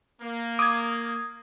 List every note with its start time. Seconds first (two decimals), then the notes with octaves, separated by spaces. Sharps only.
0.22 A#3
0.59 D6 D#6 G#6